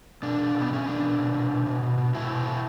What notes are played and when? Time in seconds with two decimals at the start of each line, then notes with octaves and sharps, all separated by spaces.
0.23 B2 D4
0.38 B2
0.55 B2
0.61 B3
0.70 B2 C#4
0.86 B2 D4
1.03 B2
1.18 B2
1.34 B2
1.50 B2
1.66 B2
1.82 B2
1.98 B2
2.14 B2 E4
2.30 B2
2.45 B2